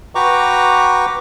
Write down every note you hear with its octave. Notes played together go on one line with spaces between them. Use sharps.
F#4 B4 G5 A#5 C#6 D6